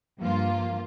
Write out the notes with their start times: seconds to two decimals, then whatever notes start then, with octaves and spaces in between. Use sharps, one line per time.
0.19 G2 F3 A#3 F4